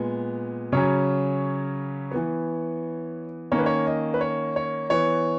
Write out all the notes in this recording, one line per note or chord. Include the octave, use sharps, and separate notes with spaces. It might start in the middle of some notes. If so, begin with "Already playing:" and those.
Already playing: A#2 G#3 B3
C#3 F#3 C#4 C#5
E3 B3
D#3 A#3 C#4 C#5
B4
C#5
D#5
B4
C#5
C#5
E3 B3 C#5